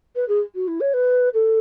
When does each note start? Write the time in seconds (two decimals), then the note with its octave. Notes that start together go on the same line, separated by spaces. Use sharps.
0.16 B4
0.28 G#4
0.55 F#4
0.68 E4
0.80 C#5
0.94 B4
1.34 A4